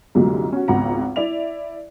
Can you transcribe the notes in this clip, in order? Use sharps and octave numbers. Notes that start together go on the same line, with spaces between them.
C2 F#2 A#2 D3 F#3 G#3
C#4 F#4
G#1 C#2 B3 F4 F#5 A#5
E4 D5 E5 F7